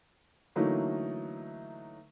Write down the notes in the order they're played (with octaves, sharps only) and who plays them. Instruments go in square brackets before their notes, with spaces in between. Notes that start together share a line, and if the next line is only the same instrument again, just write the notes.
[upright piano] D3 E3 F#3 A3 A#3 D#4